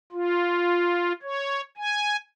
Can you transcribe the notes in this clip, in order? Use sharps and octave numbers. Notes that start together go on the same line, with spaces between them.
F4
C#5
G#5